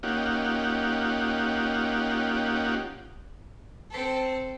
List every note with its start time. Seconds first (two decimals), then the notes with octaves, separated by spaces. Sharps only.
0.03 A#3 C#4 D#4 F4 G4 F#5
3.90 C4 A4